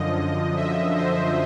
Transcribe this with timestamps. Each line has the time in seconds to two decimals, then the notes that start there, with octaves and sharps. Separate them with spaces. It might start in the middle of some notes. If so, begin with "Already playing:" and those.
Already playing: F#2 D3 F3 D#5
0.56 E5
0.96 C5